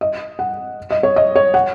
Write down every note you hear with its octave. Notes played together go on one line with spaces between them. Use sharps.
D#5
F#5
D#5
C#5
D#5
C#5
F#5